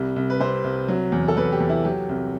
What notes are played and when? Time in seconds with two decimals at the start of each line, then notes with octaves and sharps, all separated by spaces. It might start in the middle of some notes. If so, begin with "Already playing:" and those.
Already playing: C2 G3
0.16 C2
0.30 B4
0.40 C3 C5
0.64 C2
0.88 F#3
1.12 E2
1.28 A4
1.37 E2 B4
1.52 G4
1.60 E2
1.69 E4
1.85 F#3 G4
2.09 C2